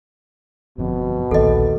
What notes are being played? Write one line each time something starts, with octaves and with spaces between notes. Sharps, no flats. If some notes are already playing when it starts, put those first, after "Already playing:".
G1 F2 B2
A#1 D#2 D#3 A4 D#5